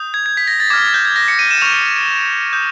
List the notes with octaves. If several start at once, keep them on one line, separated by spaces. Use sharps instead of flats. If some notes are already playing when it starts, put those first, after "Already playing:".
Already playing: D#6 G6
G#6
G#6
B6
A#6
A6
D6 F6 G#6
G#6
G6
G#6
A#6
C#7
D#7
E7
C#6 F6 F7
D#6 G6